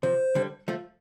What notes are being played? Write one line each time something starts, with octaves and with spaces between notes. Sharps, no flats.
C3 F3 C5
D3 G3
F3 A3